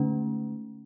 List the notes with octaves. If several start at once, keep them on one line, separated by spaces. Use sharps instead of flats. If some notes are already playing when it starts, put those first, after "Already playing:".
Already playing: D3 A3 C#4